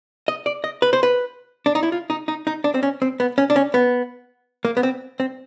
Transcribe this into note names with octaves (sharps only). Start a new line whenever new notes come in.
D#5
D5
D#5
B4
C5
B4
D4
D#4
E4
F4
D#4
D#4
D#4
D4
C4
C#4
C4
B3
C#4
D4
C#4
B3
A#3
B3
C4
C4